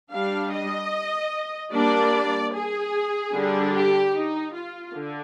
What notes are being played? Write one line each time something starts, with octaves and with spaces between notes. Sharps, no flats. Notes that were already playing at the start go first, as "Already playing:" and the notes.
G3 D4 F5
D#5
G3 A#3 D4 D5
G#4
D3 G3 D4
G4
D#4
F4
D3